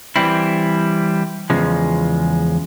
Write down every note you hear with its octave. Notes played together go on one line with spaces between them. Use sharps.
E3 G3 C4 E4
E2 C#3 F3 G#3